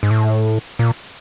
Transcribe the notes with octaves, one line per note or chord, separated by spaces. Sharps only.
G#2
A2
A#2